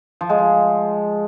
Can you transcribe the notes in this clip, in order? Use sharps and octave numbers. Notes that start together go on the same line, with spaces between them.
F3
G#3
F3